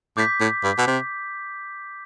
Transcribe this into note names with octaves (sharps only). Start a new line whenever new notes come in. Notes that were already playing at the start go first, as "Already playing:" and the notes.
A2 D6 G6 B6
A2
G2
B2
C3